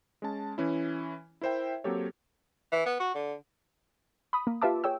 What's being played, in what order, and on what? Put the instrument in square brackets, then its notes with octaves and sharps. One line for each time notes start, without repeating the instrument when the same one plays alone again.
[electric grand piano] G#3 C#4 A5
E3 C#4 E4
E4 A#4 C5 E5 G5
F#3 A#3 C4 G4 A4 C#5
[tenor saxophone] E3
B3
F#4
D3
[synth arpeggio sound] B5 D#6
A#3
F4 G4 B4 E5 A5 D6
G#4 C#5 G5 E6